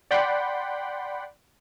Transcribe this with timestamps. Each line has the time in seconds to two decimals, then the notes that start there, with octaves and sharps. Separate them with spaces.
0.11 D5 F#5 G5 B5 C6